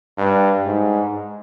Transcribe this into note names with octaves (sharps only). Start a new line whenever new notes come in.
G2
G#2